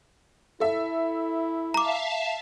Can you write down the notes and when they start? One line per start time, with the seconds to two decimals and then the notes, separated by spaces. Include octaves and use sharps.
0.60 E4 A4 E5
1.74 E5 F5 A5 A#5 D6